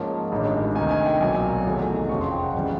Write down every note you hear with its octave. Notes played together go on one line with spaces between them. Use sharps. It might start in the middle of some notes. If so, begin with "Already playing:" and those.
Already playing: G#2 F3 A#3 C#4 A5
A1 G2 D#3 G#3
D2 C3 D#3 G#5
G#5
G5
B1 A#2 F#3 G#5
E2 C3 D#3 F#3 A3
F1 F2 C#3 F3 C#6
C6
G5
F#5
G#1 F#2 C#3 E3 G3